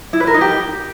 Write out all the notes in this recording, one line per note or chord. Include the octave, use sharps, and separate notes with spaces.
E4
B4
A#4
D#4
G4